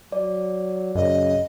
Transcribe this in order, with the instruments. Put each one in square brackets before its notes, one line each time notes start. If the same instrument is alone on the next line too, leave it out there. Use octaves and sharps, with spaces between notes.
[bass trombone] F#3 [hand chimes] D5
[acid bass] F#2 [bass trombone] C#3 [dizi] D#5